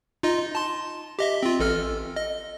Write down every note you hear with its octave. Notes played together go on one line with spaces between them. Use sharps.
D#4 F4 D#5
A5 C6
G4 D#5 E5
C4 F4
A1 A4 F6
D#5